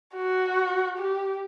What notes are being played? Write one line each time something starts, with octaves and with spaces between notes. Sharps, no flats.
F#4
G4